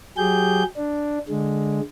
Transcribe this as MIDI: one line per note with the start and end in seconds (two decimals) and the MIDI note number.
0.17 0.63 54
0.17 0.63 67
0.17 0.63 68
0.17 0.63 91
0.77 1.19 62
1.29 1.80 50
1.29 1.80 56